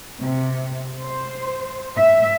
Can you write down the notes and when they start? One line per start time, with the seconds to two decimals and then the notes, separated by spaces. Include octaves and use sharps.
0.21 C3
1.01 C5
1.96 E5